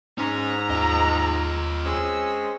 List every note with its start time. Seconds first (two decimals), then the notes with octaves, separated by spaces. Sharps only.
0.18 G#2 C#4 A#5
0.70 D#2 F4 D#5
1.85 G#3 C4 C#4 E6